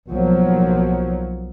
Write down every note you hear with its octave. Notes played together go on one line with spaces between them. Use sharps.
B1 F3 F#3 A#3